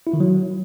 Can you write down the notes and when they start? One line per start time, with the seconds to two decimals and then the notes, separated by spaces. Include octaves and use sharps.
0.07 E4
0.13 D#3
0.20 F#3